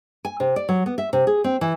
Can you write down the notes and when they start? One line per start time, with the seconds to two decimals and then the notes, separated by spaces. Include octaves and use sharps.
0.25 G#5
0.40 C3
0.56 D5
0.69 F#3
0.86 B3
0.98 E5
1.13 C3
1.27 G#4
1.44 C4
1.61 E3